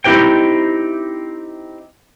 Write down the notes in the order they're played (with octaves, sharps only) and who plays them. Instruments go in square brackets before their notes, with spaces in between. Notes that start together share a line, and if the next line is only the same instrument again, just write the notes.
[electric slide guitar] C4 D#4 E4 G4 C5 G5